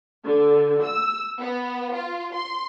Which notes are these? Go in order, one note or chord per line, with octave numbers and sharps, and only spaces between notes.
D3
E6
B3
F4
C6